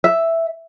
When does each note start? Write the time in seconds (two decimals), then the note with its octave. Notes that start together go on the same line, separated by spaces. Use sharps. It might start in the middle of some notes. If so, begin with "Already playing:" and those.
0.04 E5